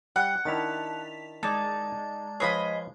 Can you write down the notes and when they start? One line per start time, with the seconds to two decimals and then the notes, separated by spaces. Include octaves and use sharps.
0.16 G3 F#5 G5
0.45 D#3 D4 E4 A5 B6 F7
1.43 G#3 D#4 D5 A5
2.40 F3 G#4 B4 C#5 D#5 B5